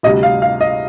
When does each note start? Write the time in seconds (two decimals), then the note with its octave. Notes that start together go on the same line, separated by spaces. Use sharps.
0.03 D2 C3 G3 D#5
0.23 F5
0.42 F5
0.61 D#5